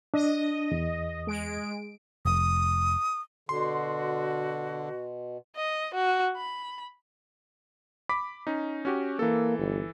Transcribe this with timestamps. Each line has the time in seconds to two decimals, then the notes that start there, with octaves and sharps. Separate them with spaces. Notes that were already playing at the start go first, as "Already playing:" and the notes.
0.14 D4 D#5
0.71 E2
1.27 G#3 D7
2.26 F1 D#6
3.49 B2 D3 F#4 C6
5.56 D#5
5.95 F#4
6.37 B5
8.09 B5 D6 B6
8.47 C#4 D#4
8.85 C#4 F#4 G4
9.19 E3 A#3 A4
9.59 G1